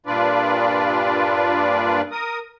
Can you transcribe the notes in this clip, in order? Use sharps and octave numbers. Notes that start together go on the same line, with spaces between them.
G2 A#2 D4 F4 B4 D5
A#4 D#6